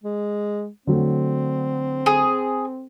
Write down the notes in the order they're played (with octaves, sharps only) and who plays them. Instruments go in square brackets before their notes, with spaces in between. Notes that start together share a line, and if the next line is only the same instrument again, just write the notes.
[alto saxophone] G#3
[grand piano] D3 F#3 A3 [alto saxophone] C4
[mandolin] G#4